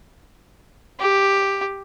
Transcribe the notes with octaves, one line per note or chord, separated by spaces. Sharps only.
G4